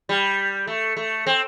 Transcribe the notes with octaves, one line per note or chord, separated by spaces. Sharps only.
G3
A3
A3
C4